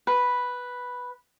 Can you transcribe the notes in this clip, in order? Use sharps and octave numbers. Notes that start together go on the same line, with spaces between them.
B4